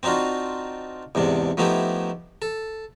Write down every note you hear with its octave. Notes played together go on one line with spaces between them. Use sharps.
C4 D4 D#4 F4 F#4
E2 G#2 C3 D4
F3 A3 B3 D#4 E4 G4
A4